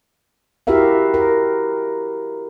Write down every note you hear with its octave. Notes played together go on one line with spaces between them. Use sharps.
E4 F#4 G4 A#4 E5 F5
A#4